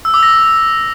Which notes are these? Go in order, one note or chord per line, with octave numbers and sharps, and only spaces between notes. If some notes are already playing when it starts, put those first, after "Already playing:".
E6
D6
A#6